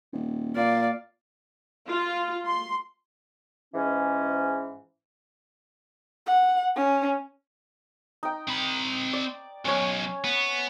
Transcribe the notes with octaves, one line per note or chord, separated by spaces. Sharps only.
D#1
A#2 D5 F5
F4
C6
G#2 E3 C#4
F#5
C#4
D#4 G5
C4 B5
D5
B1 C#4 C#5
B3